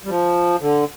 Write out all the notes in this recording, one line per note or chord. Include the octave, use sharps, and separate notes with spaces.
G3
F3
D3